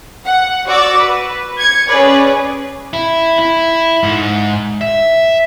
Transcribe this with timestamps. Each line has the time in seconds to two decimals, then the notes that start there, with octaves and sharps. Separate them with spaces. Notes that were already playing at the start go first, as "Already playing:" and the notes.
0.24 F#5
0.66 F#4 D5 D6 E6 A6
0.98 B4
1.57 G#6 C#7
1.88 C#4 G#4 B4 D5
2.93 E4
3.39 E4
4.03 G#2
4.81 E5